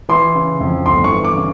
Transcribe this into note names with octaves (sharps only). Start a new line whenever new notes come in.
E3 C6
C#3
F2
G1 C6
C#6
E3
D6
C#3